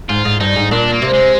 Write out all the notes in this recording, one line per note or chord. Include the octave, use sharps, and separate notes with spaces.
G#2 F4
G#2
G2 D#4
G#2
A#2 D4
A#3
C3
G#3